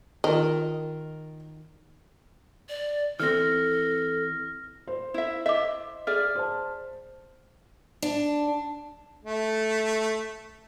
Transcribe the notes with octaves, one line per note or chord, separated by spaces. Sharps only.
D#3 F4 A#4 D#5
D5
E3 C4 A4 F6 A#6
C5
E4 E5
D#5 E5 D6
G#4 D5 E5 F6
C5 A5
D4
A3